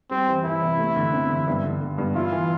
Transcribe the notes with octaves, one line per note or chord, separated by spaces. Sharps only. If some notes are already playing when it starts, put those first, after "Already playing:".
G3 C4
E3
E3 E4
C3
A3
D3
C4
D3
G2
D3
D3
G2
E4 F4
E3